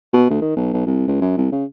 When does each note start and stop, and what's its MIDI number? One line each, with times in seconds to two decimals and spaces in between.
0.13 0.25 47
0.30 0.40 38
0.41 0.53 51
0.57 0.70 35
0.73 0.84 35
0.86 1.07 36
1.08 1.19 37
1.21 1.37 42
1.37 1.50 36
1.52 1.65 49